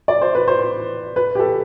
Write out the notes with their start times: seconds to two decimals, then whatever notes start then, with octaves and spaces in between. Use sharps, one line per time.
0.08 D5
0.21 C5
0.35 B4
0.48 C5
1.16 B4
1.35 G4
1.39 A4